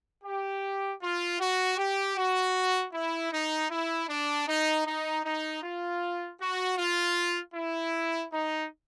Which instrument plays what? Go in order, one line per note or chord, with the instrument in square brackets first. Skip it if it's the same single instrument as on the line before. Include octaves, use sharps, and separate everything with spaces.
[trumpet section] G4
F4
F#4
G4
F#4
E4
D#4
E4
D4
D#4
D#4
D#4
F4
F#4
F4
E4
D#4